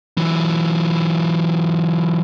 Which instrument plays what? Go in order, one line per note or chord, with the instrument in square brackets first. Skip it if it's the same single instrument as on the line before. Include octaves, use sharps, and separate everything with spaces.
[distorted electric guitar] E3 F#3